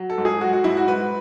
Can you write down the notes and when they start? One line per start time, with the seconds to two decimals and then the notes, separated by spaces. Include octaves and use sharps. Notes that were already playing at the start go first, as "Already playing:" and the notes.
Already playing: F#3
0.10 A4
0.18 G#2
0.25 G#4
0.41 F#3 F#4
0.53 F#4
0.64 G#2 E4
0.77 F#4
0.88 G#2 B4